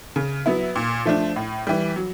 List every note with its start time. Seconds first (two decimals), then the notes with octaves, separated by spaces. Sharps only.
0.16 C#3
0.46 F#3 B3 E4
0.75 A#2
1.06 F3 A3 D4
1.36 A2
1.67 E3 G3
1.96 F#3